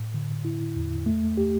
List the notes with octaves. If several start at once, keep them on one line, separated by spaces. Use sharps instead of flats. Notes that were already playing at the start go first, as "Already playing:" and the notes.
Already playing: A2
D3
E4
E2
A3
G4